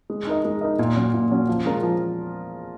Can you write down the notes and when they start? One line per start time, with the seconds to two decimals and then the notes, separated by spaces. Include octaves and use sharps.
0.10 G#3
0.27 D#4 A#4 D#5
0.45 G#3
0.61 D#4 A#4 D#5
0.79 A#2
0.96 F#3 C#4
1.14 A#2
1.31 F#3 C#4
1.48 F3
1.66 G#3 C#4 F4 A#4
1.83 F3